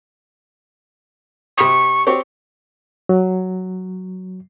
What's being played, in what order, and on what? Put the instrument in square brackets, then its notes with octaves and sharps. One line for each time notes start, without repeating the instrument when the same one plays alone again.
[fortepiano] C3 B5 D#6 [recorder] C#6
[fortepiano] C4 G4 C#5
[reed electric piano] F#3